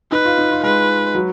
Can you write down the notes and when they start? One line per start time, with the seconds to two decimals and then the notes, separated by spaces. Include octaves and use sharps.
0.12 D#4 B4
0.25 F4
0.38 D#4
0.51 F4
0.63 G#3 B4
1.15 F#3